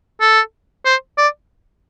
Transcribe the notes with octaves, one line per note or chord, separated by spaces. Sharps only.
A4
C5
D5